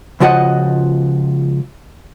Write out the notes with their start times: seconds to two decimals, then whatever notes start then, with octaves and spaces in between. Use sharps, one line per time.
0.20 C#2 C#3 F3 F#4 D#5 F#5